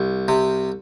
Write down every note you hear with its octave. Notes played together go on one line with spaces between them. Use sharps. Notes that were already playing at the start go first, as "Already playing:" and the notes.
Already playing: C2
C3